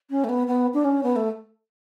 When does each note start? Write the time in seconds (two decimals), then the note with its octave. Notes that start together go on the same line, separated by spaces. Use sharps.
0.10 C#4
0.24 A3
0.29 B3
0.48 B3
0.74 D4
0.84 C#4
1.03 B3
1.16 A3